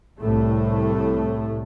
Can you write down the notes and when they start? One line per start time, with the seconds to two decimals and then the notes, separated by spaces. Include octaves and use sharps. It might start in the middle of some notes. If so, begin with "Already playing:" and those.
0.19 C2 A2 A3